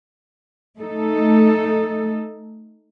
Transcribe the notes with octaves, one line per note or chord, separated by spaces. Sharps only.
A3 D#4 A4